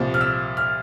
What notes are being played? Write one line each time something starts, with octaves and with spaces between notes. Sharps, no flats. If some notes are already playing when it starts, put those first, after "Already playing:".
Already playing: C2 A#2 F3
F6
E6
F6